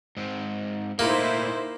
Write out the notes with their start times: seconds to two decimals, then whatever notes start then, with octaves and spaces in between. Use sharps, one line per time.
0.17 G#2 C4
0.99 A#2 A3 A#3 D#4 E4 C5